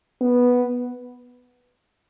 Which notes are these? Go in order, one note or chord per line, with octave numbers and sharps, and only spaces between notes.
B3